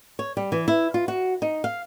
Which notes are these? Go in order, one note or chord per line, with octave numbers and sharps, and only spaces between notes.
C#5
G3
E3
E4
F4
F#4
D#4
F5